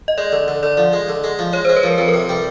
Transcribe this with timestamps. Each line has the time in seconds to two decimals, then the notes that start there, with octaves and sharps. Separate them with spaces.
0.08 D#5
0.18 G#3 D5
0.32 D3
0.48 D3
0.63 D3 D5
0.77 F3
0.93 G#3
1.09 D3
1.24 G#3
1.39 F3
1.53 G#3 C#5
1.65 G#3 C5
1.76 B4
1.83 F3 A#4
1.98 F2 B4
2.08 A#4
2.14 C3
2.29 G3